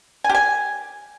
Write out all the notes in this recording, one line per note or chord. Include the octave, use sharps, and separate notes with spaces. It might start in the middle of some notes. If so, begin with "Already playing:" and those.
G#5
G4
G#5